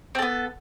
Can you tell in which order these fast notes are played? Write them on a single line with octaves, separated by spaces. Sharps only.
C4 A4 B3